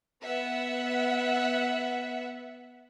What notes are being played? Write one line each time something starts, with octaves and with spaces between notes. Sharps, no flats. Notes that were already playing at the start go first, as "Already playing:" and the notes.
B3 E5 F#5